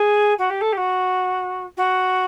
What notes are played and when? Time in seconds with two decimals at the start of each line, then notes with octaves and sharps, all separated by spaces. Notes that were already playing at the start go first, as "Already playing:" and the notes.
Already playing: G#4
0.38 F#4
0.50 G4
0.61 A4
0.72 G4
0.77 F#4
1.77 F#4